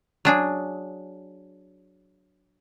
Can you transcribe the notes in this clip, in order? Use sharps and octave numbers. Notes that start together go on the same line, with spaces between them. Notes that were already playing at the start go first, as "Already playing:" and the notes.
F#3 D4 G#4